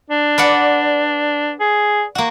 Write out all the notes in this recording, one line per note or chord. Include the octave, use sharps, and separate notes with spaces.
D4
B4 D5 F#5
G#4
A#3 F#4